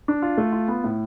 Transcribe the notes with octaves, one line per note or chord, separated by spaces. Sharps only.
D4
F4
A3
F4
B3
A2